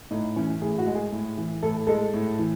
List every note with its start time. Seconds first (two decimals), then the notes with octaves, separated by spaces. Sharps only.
0.11 A2 D#4
0.36 E3 C#4
0.61 A2 G#4
0.79 F#4
0.87 G#3
0.95 G#4
1.12 A2
1.38 E3
1.63 A2 A4
1.87 G#3 A4
2.14 A2
2.39 E3